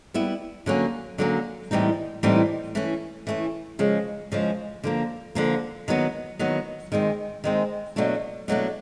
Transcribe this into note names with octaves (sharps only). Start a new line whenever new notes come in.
G3 B3 E4
D3 F#3 A#3 C#4
D3 F#3 A#3 C#4
A2 E3 G3 C4 D#4
A2 E3 G3 C4 D#4
E3 A3 C#4
E3 A3 C#4
C#3 F3 G#3
C#3 F3 G#3
D3 F3 A#3
D3 F3 A#3
D#3 F#3 B3
D#3 F#3 B3
D#3 G#3 C4
D#3 G#3 C4
B2 F#3 A3 D4
B2 F#3 A3 D4